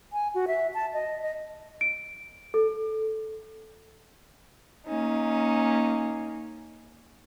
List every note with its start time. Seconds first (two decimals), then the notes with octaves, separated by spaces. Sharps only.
0.13 G#5
0.35 F#4
0.48 E5
0.74 A5
0.93 D#5
1.22 D#5
1.81 D7
2.54 A4
4.86 A#3 C#4 D#4